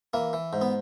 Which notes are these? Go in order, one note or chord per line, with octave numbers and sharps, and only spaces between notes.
E3 A#3
E3
G#2
B3